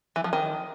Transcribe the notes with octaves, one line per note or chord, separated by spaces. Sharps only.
E3
F3
D#3